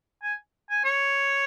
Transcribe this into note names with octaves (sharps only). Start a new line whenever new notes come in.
G#5
G#5
C#5